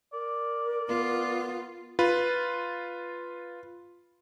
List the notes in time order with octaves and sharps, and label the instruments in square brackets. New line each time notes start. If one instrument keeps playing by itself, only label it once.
[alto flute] A#4 [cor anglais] D5
[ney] B3 [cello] F4
[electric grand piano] F4 B4